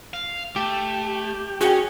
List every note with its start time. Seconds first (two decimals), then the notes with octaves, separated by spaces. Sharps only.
0.14 F5
0.56 A3 G4
1.61 C#4 F#4 G#4 G5